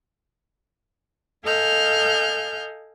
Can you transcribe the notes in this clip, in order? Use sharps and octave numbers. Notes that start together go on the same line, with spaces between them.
A4 D#5 F5 G#5 F6 G6